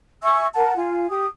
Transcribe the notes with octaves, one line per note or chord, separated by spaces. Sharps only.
E5 G#5 C#6 E6
A#4 F#5 A5
F4 G#5
G4 D#6